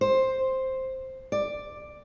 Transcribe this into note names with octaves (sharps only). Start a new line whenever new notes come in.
C5
D5